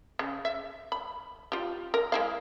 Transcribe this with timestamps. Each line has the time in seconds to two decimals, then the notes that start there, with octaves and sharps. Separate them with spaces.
0.19 C#3
0.45 E5
0.92 B5
1.52 F4 G4
1.94 A#4
2.12 G#3 E4 F5